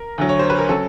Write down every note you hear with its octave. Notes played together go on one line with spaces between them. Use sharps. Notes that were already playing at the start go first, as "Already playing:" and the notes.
Already playing: A#4
D2 D3 F#3
C#5
C5
B4
A#4
C#3 F#3 A4